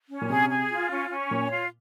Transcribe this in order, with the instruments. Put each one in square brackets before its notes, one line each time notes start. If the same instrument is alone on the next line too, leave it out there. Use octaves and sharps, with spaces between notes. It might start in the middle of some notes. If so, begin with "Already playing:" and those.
[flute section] C#4
[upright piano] A#2
[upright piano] C3 [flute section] G#4
[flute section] G#4
F4
C#4
C#4
[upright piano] A#2 [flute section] C#5
[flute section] F4